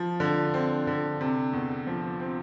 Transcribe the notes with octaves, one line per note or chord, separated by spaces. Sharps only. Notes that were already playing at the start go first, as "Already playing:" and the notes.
Already playing: F3
D3
C4
D3
C3
E2
F3
C4